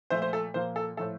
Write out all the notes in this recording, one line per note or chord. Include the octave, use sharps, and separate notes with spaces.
A#2 F3 A3 C5
C5
A4
A#2 F3 A#3 C5
A4
A2 F3 A3 A4